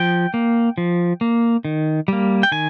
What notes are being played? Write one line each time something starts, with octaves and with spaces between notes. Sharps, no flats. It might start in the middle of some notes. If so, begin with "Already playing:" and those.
Already playing: F3 G5
A#3
F3
A#3
D#3
G3 A#3
G5
D#3 G#5